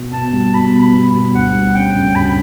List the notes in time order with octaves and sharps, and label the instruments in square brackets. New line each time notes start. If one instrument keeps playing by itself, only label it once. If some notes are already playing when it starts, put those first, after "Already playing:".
Already playing: [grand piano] B2 B3
[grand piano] B2 [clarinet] A5
[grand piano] G3
[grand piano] B2 [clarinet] B5
[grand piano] B3
[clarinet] B5
[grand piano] B2
G3
[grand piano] D2 [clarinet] F#5
[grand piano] G3
[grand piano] C#4 [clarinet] G5
[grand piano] C#3
[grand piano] D2 [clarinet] B5